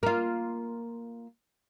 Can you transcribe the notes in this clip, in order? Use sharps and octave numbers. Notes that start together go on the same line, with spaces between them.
A#3 F4